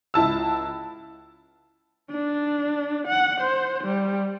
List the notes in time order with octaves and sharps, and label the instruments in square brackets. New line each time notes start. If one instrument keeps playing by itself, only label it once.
[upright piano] C#2 E4 A5 E6
[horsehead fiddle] D4
F#5
C5
G3